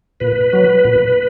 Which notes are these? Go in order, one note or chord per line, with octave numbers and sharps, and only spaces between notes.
A#2 B4
F#3
A#2